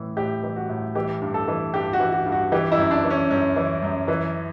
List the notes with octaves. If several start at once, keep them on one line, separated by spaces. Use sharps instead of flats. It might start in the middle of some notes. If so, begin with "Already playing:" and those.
Already playing: A2 E3
A2 G4
E3
F#4
A2
E3 G4
G2
A4
E3
G2 G4
F#4
E3
F#4
G2
F#4
E3 G4
E4
F#2
D4
E3
C#4
F#2 C#4
E3
F#2
E3